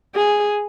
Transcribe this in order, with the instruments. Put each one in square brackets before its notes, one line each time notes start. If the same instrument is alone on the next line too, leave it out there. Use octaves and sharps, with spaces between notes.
[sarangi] G#4